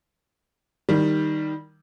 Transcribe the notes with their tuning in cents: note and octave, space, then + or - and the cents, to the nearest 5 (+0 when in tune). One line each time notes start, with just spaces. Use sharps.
D#3 +0 G3 +0